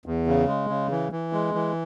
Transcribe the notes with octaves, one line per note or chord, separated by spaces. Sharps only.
E2
C#3
G#3
C#3
E3
E3
G#3
E3